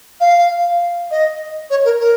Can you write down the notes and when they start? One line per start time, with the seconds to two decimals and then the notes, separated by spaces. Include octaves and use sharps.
0.20 F5
1.10 D#5
1.70 C#5
1.84 A#4
2.00 A#4